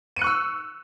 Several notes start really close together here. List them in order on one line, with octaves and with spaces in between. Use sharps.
D#7 C#7 F#6 C#6 E6